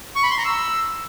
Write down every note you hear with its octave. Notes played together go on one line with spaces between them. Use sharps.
C#6
B5
C6
A#5
E6